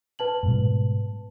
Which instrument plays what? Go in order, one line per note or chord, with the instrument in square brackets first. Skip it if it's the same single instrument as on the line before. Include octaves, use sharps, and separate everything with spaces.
[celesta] B4 A5 F#7
[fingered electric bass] G#2 B2 G3